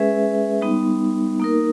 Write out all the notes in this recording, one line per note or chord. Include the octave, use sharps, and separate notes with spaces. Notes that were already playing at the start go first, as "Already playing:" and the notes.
Already playing: G#3 C#4 G#4 B4 E5
G3 B3 D#4
A#3 D#4 A#4